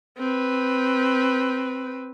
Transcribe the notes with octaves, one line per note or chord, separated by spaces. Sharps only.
C4 B4